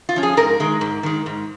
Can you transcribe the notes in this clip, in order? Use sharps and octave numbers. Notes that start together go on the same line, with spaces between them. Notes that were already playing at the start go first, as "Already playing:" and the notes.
F4
F3 C#4
G#4
G#2 A#4
D#3 G#3
G#2
D#3 G#3
G#2